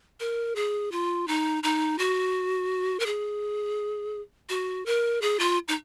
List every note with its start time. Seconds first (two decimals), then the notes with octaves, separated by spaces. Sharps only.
0.20 A#4
0.56 G#4
0.92 F4
1.28 D#4
1.63 D#4
1.99 F#4
3.00 A#4
3.06 G#4
4.49 F#4
4.86 A#4
5.22 G#4
5.40 F4
5.68 D#4